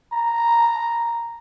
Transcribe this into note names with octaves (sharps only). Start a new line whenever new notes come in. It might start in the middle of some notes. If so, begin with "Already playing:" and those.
A#5